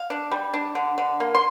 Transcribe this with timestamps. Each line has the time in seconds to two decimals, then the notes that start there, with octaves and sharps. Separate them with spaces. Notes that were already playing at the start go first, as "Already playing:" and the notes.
Already playing: F5
0.10 D4
0.31 G3
0.54 D4
0.75 D3
0.98 D3
1.20 A#3
1.35 C6